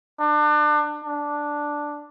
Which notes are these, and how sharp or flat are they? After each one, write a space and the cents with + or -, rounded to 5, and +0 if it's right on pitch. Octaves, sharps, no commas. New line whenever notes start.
D4 +30
D4 +0